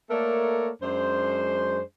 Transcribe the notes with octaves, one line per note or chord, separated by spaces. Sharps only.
A3 A#3 A4 A#4 C#5 D5
F#2 G#3 D4 C5